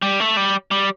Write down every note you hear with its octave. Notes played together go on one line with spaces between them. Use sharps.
G3
A3
G3
G3